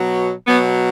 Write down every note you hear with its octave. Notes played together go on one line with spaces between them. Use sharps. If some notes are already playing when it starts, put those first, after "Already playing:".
Already playing: B2 F#3
B2 F#3 B3